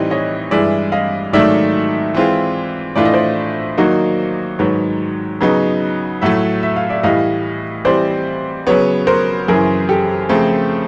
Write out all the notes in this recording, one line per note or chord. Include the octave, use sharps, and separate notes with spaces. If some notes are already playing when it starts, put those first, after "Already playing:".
Already playing: A2 E3 G3 C4 D#4 D5
C#5 D#5
G2 E3 G#3 D5 E5
D#5 F5
G#2 D#3 F#3 A3 D5 E5
E3 G#3 C4 F4
A2 E3 A3 D4 F4 D5
D#5
C5 D5
D#3 F#3 A#3 D#4 F#4
G#2 D#3 F#3 B4 C#5
C#3 F#3 B3 D#4
A2 F#3 A3 E5 F#5
E5
F5
D5 E5
A2 E3 G3 D#5 F5
E3 G3 C4 C5 D5
C#3 F#3 B3 B4 C#5
A#4 C5
F#2 C#3 E3 G#4 A#4
G4 A4
C#3 F3 A3 C4